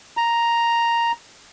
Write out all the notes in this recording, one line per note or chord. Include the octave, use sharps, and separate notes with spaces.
A#5